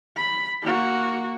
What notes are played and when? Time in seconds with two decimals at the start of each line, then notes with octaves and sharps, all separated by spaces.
0.16 B5
0.62 A#3 F#4